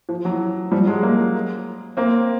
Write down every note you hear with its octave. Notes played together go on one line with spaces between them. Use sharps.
F3
E3 F#3
F3 G3
F#3 G#3
G#3 A#3
A#3 C4